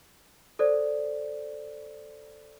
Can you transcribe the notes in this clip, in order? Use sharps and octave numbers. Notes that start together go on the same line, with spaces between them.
A4 C5 D5